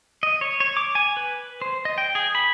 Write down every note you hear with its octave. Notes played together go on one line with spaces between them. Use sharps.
D#5
C#5
C#5
D6
G#5
B4
C5
D#5
G5
G#4
B5